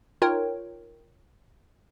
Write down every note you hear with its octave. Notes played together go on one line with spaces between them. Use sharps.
D#4 F4 A#4 C#5 G5